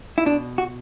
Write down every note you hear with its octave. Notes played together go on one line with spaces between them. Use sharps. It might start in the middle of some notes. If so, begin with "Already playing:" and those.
E4
B2 D4
F#4